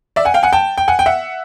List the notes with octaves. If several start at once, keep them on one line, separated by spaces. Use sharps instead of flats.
D5 E5
F#5 G#5
F5 G5
F#5 G#5
G5 A5
G5
F#5 G#5
G5
E5 F#5